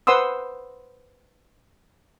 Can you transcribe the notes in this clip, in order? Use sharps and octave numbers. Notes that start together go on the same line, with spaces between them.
B4 C5 F#5 C6 D#6 E6